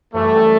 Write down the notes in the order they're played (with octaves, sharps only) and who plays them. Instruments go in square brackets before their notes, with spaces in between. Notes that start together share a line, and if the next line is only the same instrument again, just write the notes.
[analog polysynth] F#2 E3 G3 [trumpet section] A3